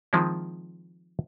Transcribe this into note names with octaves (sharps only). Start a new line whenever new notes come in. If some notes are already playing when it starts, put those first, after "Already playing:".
D#3 F3 G#3 C4 E4